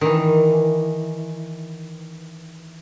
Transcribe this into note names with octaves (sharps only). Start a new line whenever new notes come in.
D#3 E3